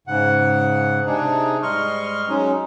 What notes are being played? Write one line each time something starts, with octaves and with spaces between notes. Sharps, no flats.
G#2 C#3 F#5
C3 D4 D#4 G#4
G#2 G3 D#5 C6 C#6 F6
F#3 G#3 C#4 D#4